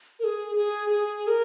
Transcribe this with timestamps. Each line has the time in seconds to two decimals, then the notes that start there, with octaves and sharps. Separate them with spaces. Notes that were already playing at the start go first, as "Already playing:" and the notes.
0.20 A#4
0.24 G#4
0.56 G#4
0.90 G#4
1.27 A#4